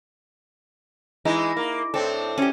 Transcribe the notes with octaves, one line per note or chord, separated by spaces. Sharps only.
E3 G#3 D#4 E4
A#3
A2 C4 D4 A4
C#4 G4